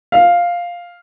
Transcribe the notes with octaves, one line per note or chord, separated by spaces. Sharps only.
F5